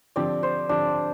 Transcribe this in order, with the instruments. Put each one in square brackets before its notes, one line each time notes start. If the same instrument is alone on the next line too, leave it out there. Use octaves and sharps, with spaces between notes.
[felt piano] D3 F3 C4 G4 [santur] D5
[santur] C5
[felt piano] D3 F3 C4 G4 [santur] D4